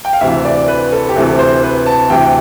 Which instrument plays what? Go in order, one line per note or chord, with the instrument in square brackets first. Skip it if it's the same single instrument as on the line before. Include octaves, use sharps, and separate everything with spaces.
[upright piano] G5
F5
D2 C3 E3 E5
D5
B4
A4
G4
D2 C3 E3 A4
C5
B4
A5
D2 C3 E3 G5